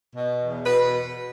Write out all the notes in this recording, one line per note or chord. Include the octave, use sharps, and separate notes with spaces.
B2
E2
B2 B4